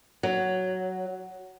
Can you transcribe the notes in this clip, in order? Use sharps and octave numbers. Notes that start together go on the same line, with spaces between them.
F#3